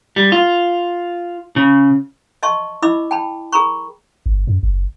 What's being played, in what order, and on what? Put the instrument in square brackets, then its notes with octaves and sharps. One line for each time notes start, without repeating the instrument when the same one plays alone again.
[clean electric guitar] G3
F4
C#3
[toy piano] D#5 E5 A5 C6 C#6
E4 D#5 E5 B5 D6 E6
G5 A5 B5
G#4 A#4 A#5 B5 C#6
[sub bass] G1
F#2
F#1